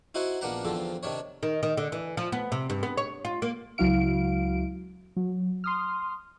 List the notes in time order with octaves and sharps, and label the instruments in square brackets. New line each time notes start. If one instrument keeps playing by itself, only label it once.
[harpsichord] D#4 E4 F#4 C5 F#5 G#5
A#1 A#3 B3 D4 F#5 A#5
E2 D3 F3 C4 A4
C3 D#3 D4 C#5
[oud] D#3
D#3
D3
E3
F3
B3
C3
G2
B3
C#5
F4
A#3
[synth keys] C#2 F#3 E4 F#4 F5 D7
F#3
C6 D#6 F6